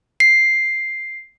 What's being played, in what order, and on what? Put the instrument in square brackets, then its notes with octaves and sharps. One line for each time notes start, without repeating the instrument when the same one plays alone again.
[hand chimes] C7